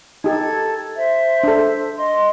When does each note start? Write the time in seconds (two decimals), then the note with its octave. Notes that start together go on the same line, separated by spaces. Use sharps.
0.24 D#4 G4 A4 G#6
0.96 C5 E5
1.44 D4 A4
1.96 D#5 C6